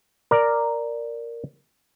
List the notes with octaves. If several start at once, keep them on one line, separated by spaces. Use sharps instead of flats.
A#4 D5